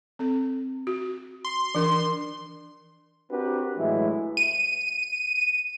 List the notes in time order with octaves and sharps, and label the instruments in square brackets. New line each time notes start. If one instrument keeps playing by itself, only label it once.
[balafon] C4 A4
F#4
[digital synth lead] C6
[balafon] E3 D4 A#4 [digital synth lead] C6
[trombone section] C4 D4 F#4 G4 A#4 B4
A2 E3 F#3 G#3 E4
[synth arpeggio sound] D#7